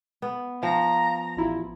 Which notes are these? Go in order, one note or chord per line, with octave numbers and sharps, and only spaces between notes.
B3
F3 F5 G5 A#5 A#6
A1 E4 F4